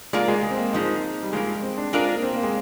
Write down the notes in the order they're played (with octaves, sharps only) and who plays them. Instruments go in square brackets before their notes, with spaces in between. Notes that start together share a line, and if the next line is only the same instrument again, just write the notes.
[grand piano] G#3 [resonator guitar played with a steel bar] A#3 F4 A#4 D5
[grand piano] G#3
G#3
C4
A#3
[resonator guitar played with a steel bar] G2 F3 G#3 [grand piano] D#4
[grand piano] G3
[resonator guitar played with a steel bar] G2 F3 A#3 [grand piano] G#3
[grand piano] C4
D4
[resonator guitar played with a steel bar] G#3 D4 F4 A#4 D5
[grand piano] A#3
C4
A#3
G#3